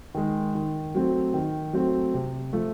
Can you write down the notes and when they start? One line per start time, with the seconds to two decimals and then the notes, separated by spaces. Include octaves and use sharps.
0.15 D#3 G#3
0.55 D#3
0.95 F#3 A3 C4
1.34 D#3
1.73 F#3 A3 C4
2.14 C3
2.53 F3 A3